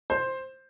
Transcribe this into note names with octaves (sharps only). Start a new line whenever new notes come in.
C5